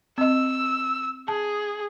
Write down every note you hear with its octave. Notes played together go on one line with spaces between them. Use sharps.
C4 D#5 E6
G#4 A5